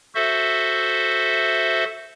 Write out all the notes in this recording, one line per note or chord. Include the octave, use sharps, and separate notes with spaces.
F#4 A4 C5 E5